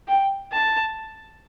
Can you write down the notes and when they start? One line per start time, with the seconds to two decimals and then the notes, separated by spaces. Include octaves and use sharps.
0.08 G5
0.52 A5